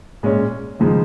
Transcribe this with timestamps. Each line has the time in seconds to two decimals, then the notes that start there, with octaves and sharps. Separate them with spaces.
0.23 A#2 G#3 C#4
0.80 D#2 C#3 F3 G#3 D#4